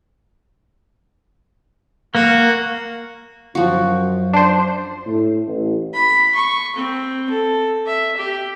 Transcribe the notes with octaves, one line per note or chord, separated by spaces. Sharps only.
A#3 F#4
F#2 F3 F#4
D4 C5
A2
A1
B5
C#6
C4
A4
E5
G4